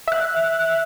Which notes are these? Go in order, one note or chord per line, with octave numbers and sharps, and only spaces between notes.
E5 F#6